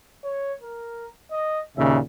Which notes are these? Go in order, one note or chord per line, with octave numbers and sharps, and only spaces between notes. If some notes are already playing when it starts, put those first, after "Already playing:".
C#5
A#4
D#5
D#2 A#2 C#3 E5